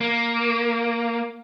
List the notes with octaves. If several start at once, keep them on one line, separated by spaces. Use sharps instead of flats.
A#3